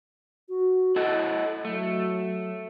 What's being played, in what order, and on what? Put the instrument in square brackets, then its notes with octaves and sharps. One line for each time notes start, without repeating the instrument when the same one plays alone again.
[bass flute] F#4
[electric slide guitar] E4 A4 F#5 [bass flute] D#5
[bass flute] F#3 [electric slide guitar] A3